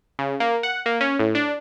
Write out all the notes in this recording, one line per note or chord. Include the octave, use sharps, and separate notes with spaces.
C#3
A#3
F#5
A#3
C#4
A2
D4